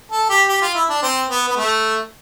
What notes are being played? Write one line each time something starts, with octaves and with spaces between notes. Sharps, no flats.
A4
G4
G4
F4
E4
D4
C4
B3
B3
A3